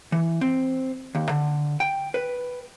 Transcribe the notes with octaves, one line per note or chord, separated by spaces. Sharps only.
E3
C4
D#2
D3
G5
B4